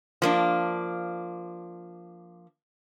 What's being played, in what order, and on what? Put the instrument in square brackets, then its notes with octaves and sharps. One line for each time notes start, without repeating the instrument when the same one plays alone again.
[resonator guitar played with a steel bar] F3 A#3 D4